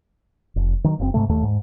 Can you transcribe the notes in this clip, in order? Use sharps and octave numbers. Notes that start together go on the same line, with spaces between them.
F1
D#3 F#3
F#1 A#2 C4
G#2 C3 A3
D#2 A3
G#2